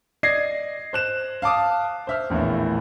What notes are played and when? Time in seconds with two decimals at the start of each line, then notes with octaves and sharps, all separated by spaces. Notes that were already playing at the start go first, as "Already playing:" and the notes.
0.23 D5 D#5 G#6 A#6 C7
0.93 C5 F#6 E7
1.42 F5 A5 D6 D#6
2.07 C5 E5 F6
2.30 A#1 E2 A2 A#3